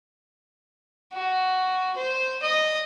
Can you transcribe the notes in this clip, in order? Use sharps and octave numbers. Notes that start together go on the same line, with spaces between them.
F#4
C5
D#5